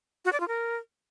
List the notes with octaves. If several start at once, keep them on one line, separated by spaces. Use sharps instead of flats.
F#4
D5
F4
A#4